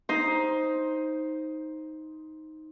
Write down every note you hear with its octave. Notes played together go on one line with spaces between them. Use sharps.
D#4 C5